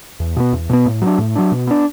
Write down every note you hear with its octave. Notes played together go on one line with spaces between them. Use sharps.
E2
B2 B3
E2
B2 B3
A2
F#3 D4
A2
F#3 D4
B2
B3 D4